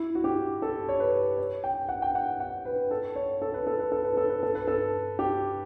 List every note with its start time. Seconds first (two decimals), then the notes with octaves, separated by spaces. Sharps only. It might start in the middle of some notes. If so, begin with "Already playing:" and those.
Already playing: E4
0.15 F#4
0.24 G4
0.62 A4
0.89 C#5
1.00 B4
1.38 C#5
1.64 G5
1.89 F#5
2.02 G5
2.15 F#5
2.40 F#5
2.65 B4
2.91 A4
3.16 C#5
3.42 A4
3.54 B4
3.67 A4
3.79 B4
3.92 A4
4.04 B4
4.17 A4
4.30 B4
4.43 A4
4.55 B4
4.67 A4
5.19 G4